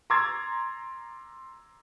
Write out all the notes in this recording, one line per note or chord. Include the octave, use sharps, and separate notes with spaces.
A#5 C6 D6 E6 G#6 A6